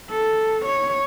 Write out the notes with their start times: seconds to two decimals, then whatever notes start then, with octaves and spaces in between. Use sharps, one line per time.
0.10 A4
0.65 C#5